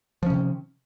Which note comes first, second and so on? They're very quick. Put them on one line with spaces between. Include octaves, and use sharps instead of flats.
F3 C#4 C3 D#3